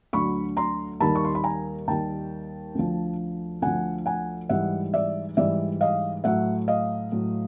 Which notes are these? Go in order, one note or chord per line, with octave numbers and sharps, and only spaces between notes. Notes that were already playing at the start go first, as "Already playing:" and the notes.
D2 D3 F#3 B5 C#6
A#5 C6
D#2 D#3 G3 A5 B5
C#6
C6
B5
G#5 A#5
D#2 D#3 G3 G5 A5
D2 D3 F3
D2 D3 F3 F#5 G#5
F#5 G#5
G#2 E3 G3 E5 F#5
D5 E5
G#2 E3 G3 D5 E5
D#5 F5
A2 F#3 E5 F#5
D#5 F5
A2 F#3